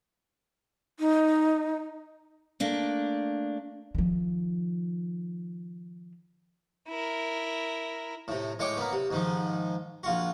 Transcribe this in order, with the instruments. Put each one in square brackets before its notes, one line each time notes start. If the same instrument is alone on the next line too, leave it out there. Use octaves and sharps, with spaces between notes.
[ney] D#4
[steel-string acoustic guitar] A3 A#3 D4
[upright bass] D#3 F3
[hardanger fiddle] E4 A#4
[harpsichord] A2 C3
A2 G#3 C#5 G5 D6
A#3 B3
C3
G#2 D#3 F3
A#1 F4 F#4